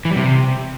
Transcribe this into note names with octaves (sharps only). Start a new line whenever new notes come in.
E3
G3
C3